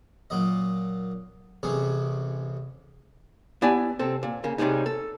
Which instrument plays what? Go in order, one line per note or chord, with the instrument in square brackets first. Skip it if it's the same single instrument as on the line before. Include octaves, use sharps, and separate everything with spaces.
[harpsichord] A#2 F#3 D#5
A1 C3 C#4 G#4
[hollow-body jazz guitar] B3 E4 G4 D5 G#5 A5
C3 C4 A4
A#2
C#3 A#3
A2 C3 G3 G#3 D#4
A4